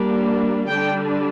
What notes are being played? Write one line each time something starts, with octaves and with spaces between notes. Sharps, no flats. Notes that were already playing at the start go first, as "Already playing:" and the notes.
Already playing: G3 A#3 D4
D3 G3 D4 G5